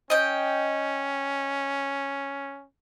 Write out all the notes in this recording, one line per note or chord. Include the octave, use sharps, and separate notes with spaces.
C#4 D#5 G5